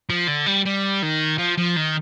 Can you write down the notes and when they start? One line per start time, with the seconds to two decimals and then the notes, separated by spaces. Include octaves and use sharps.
0.10 F3
0.28 D3
0.46 G3
0.65 G3
1.03 D#3
1.39 F3
1.58 F3
1.77 D#3